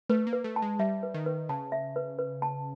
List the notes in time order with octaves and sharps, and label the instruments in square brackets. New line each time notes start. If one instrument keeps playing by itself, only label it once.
[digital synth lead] A3 [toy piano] B4
[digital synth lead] A#3
[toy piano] B4
[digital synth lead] A3
[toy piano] A5
[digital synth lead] G#3
[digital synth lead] G3 [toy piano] E5
[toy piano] B4
[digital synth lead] D#3
[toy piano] B4
[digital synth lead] C#3 [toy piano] A5
[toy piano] E5
B4
B4
A5